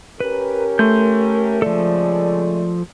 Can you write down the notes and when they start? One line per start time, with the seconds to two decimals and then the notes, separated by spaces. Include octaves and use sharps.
0.20 C#4 G4 A#4 B4
0.79 A3 C6 G6
1.62 C#3 F3 G#3 A4 D5